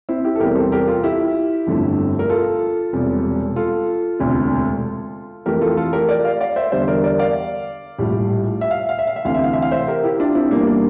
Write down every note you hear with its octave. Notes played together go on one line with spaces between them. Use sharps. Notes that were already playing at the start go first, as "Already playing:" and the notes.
C4 E4
E4 G4
A4
E2 C3 G3 G4 A#4
A4 C5
G4 A#4
F4 A4
E4 G4
G1 F2 D3 F3 A3
A#4
F4 A4
E1 E2 C3 G3
F4 A4
E1 D2 C3
F2 E3 A3 G4 A#4
F4 A4
F4 A4
G4 A#4
A#4 D5
D5 F5
D5 F5
C5 E5
E2 D3 G3 C5 E5
A#4 D5
A#4 D5
D5 F5
A#1 A2 G3
E5
F5
E5
F5
E5
F5
E5
D2 C3 E3 F5
E5
F5
E5
F5
C5 E5
G4 A#4
E4 G4
D4 F4
C4 E4
E2 E3 G3 A#3 D4
A#3 D4